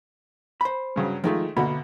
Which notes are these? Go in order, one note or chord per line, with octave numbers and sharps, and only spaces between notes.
C5 B5
G2 C#3 F#3
D#3 F3 G#3 A3 D#4 F4
D2 B2 D3 A#3 B5